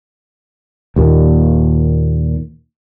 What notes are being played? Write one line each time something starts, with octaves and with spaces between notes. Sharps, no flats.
D#2 A#2